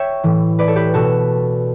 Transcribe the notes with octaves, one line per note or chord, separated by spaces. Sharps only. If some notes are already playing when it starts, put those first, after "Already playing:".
Already playing: C#5 E5 G5
A2 E3
B4 D5
A4 C#5
G4 B4
B2 F#4 A4